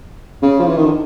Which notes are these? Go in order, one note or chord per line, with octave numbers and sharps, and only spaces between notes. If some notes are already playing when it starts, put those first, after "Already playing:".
C#3
F3
E3
D#3
D3